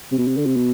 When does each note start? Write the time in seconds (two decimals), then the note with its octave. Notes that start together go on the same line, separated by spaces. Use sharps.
0.12 C3
0.18 B2
0.28 C3
0.37 D3
0.46 C3
0.56 B2